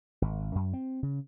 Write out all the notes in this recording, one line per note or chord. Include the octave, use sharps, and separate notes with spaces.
G#1
F#2
C4
C#3